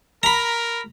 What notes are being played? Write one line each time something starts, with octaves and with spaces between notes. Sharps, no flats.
A#4 A#5 B5